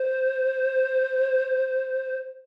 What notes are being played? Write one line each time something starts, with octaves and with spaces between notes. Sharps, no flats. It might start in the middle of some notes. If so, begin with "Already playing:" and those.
Already playing: C5